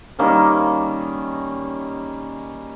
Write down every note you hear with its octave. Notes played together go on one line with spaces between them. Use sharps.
D#3 G3 A#3 C#4